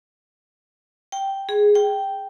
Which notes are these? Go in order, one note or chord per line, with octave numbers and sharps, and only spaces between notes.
G5
G#4
G5